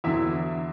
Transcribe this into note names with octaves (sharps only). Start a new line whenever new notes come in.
E2 D3 F#3 E4 E5